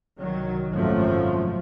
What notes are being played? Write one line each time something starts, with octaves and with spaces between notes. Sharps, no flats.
C2 D#3 F#3
G#1 F#2 C3 F3 F#3 A3